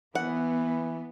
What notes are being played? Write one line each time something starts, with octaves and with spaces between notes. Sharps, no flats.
E3 B3 F#5